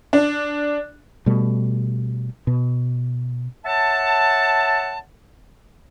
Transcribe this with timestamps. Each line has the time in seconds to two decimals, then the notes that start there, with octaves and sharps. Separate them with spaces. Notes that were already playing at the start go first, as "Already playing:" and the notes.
0.13 D4
1.26 B2 G3 A3
2.47 B2
3.65 C#5 E5 F#5 A5